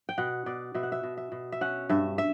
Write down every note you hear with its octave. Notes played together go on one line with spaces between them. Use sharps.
G5
B2 F#5
B2 D5
B2 E5
F#5
E5
B2
E5
B2
E5
C#4 F#5
G2 E5
E5